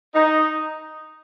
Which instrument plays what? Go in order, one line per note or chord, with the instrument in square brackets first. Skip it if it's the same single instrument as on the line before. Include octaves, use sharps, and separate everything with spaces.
[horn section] D#4